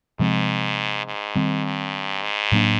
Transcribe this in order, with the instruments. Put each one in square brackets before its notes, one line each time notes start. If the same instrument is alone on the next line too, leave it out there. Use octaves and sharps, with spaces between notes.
[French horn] G#2 [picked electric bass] C3 F3 G#3 C4
[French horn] G#2
[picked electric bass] D#3 G3 C4
[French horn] G2
G#2
[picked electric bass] A2 F#3 A#3 D4